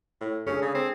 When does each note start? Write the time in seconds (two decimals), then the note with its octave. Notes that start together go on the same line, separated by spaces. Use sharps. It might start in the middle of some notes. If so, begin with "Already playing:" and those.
0.20 A2
0.47 C#4 D4 G#4 A4
0.62 C#3
0.75 C4